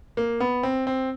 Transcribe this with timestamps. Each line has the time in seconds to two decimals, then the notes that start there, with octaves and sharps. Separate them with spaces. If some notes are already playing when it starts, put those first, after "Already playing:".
0.17 A#3
0.40 B3
0.63 C4
0.87 C4